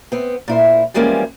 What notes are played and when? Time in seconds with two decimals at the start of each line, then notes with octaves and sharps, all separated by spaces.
0.12 B3 C4
0.48 A#2 E4 C5
0.94 E3 F3 G3 G#3 A#3 C#4